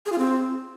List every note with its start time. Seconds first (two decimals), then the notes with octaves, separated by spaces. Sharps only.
0.06 G#4
0.12 F4
0.18 C4